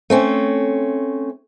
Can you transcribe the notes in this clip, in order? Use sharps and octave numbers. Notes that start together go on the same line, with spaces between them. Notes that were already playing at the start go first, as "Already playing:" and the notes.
A3 C4 C#4